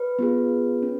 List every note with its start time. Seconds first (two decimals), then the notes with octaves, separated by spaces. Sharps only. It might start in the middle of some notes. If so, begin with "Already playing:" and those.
Already playing: B4
0.19 B3 F4 G#4
0.82 C#4